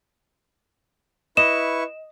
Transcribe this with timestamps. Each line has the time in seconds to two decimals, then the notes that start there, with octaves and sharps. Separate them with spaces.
1.37 E4 B4 D#5 C#6 E7